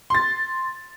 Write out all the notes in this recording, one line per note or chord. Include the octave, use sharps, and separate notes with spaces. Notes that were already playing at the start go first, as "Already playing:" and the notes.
C6 A6